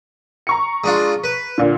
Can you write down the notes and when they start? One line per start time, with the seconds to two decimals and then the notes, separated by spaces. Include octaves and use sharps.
0.47 A#5 C#6 C#7
0.84 G#3 D4 F4
1.24 B4
1.58 A#2 D3